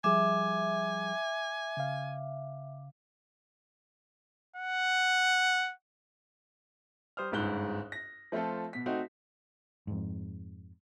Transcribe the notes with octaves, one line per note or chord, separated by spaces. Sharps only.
F3 G3 G#4 E5 G#5 D6
C#3 F5
F#5
G3 C5 D#6 F6
G1 C#2 G#2 F#6 G7
A#6
F3 A3 C4 F4 A4
B2 B6
A3 C4 D#4 F#4
F2 G#2